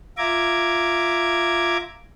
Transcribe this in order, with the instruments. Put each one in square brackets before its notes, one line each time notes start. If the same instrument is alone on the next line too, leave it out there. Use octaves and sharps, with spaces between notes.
[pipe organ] F4 E5 A#5 D6 G#6